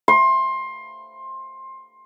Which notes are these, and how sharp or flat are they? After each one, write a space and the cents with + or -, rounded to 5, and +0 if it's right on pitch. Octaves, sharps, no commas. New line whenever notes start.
C6 +20